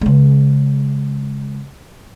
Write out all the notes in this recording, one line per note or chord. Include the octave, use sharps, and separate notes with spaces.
C#3 G#3